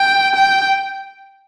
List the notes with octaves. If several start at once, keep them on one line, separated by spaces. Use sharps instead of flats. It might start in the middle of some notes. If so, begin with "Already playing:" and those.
Already playing: G5
G5